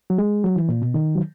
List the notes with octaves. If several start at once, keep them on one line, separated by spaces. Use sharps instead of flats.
F#3
G#3
F#3
E3
A#2
B2
D#3
F#3